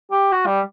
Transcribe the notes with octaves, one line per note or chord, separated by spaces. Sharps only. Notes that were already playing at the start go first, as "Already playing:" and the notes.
G4
F#4
G3